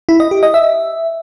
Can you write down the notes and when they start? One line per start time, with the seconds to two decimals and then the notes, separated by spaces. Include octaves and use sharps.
0.09 E4
0.20 D#5
0.31 G4
0.43 D#5
0.54 E5